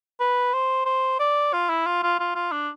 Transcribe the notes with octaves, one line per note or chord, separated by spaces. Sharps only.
B4
C5
C5
D5
F4
E4
F4
F4
F4
F4
D4